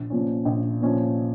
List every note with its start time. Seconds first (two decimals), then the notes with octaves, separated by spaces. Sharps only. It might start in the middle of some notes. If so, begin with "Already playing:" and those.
Already playing: A#1
0.10 A#2 F3 C#4
0.45 A#1
0.81 A#2 F3 C#4